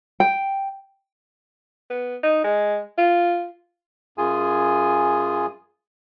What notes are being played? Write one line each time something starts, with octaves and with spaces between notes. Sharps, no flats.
G5
B3
D#4
G#3
F4
F#2 F4 G#4 G#5